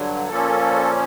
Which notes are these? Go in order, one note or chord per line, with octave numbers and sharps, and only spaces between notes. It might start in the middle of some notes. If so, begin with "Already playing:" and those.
Already playing: G2 D3 F#3
A#2 F3 A#3 C#4 A4